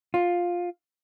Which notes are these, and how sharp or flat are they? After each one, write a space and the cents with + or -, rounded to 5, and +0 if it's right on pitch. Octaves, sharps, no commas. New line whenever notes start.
F4 +10